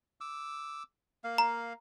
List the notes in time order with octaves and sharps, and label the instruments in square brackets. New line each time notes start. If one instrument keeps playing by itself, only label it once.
[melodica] D6 E6
A#3 F5
[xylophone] A#5